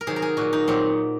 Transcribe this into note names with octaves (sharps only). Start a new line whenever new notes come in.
A#4
C3 D#3 F#3 G#4
A#4
G#4
A#2 F#3 F#4
D#4
A#2 F#3 C4